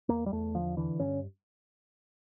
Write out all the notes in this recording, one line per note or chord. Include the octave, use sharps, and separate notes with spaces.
E2 A#3
G3
E2 A3
D3 F3
D3 E3
G2 C#4